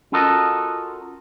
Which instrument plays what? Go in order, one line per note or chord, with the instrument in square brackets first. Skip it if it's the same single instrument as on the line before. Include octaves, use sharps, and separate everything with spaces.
[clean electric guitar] C#4 F4 F#4 A4 A#4 D#5